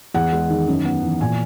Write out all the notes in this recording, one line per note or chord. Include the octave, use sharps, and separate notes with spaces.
E2 F#5
G#3
D#3
F#2
B3
E3
A#2 G#5